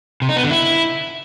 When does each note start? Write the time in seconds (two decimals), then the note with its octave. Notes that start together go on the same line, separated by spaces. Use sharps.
0.22 C3
0.29 D#4
0.36 B3
0.43 D3
0.51 E4